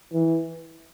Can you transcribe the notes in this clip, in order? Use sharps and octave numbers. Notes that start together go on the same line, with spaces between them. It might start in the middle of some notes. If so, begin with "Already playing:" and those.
E3